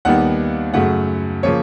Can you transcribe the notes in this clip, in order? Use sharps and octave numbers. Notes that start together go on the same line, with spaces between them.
D#2 D#3 G3 B3 F#5
F#2 C#3 F#3 A3 F#5
C#3 F3 A#3 C#5